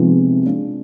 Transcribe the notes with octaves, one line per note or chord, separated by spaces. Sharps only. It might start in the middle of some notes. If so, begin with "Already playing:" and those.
Already playing: C3 F3 G#3 B3 D#4
G#3 D4 F4